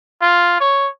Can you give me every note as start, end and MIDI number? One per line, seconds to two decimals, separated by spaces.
0.21 0.59 65
0.60 0.88 73